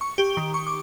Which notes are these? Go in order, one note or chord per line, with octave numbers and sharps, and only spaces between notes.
C#6
G4
D#3
C#6
D6